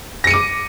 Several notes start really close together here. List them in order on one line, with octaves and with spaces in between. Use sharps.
A#6 C#7 D#7 D6